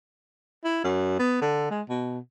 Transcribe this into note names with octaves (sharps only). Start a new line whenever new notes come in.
E4
F#2
B3
D3
G#3
B2